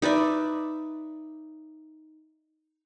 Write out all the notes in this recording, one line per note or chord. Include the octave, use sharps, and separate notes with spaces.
D#4 B4 D5 E5